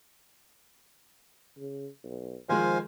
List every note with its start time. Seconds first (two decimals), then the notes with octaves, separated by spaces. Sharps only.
1.57 C#3
2.04 B1
2.49 D#3 F3 G#3 C5 F5 G#5